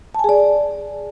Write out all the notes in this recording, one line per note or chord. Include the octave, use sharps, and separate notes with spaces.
G#4 D5 G#5 A5